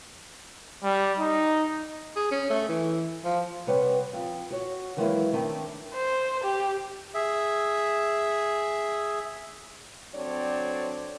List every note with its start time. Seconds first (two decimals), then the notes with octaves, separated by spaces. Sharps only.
0.84 G3
1.19 D#4
2.16 G#4
2.31 C#4
2.50 A3
2.69 E3
3.24 F3
3.67 C3 G3 B4 C#5 F#5
4.13 F2
4.51 F#4 C#5
4.97 D#3 E3 F#3 G#3 A#3 E4
5.33 D#3 A3 C4 D4
5.95 C5
6.44 G4
7.15 G#4 E5
10.15 F#3 C4 D4 A4 C#5 D5